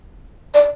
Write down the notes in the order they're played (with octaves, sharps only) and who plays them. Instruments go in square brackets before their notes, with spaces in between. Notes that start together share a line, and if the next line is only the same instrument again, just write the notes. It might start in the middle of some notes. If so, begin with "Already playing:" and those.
[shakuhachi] D5